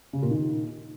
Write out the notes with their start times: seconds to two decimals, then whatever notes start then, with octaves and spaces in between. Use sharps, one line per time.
0.13 C#3
0.22 A#2
0.31 D#3